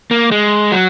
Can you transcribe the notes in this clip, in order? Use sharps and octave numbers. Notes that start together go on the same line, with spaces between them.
A#3
G#3
F#3